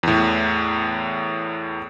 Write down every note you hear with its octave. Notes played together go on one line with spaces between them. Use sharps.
E2 A2